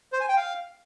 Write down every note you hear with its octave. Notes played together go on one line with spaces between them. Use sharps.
C5
G#5
G5
F5